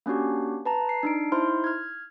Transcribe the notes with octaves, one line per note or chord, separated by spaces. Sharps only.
A#3 C#4 D4 F#4 G4
B4 A5 A#5
C7
D4 D#4 D7
D#4 E4 C5 C6 F6
F6 G#6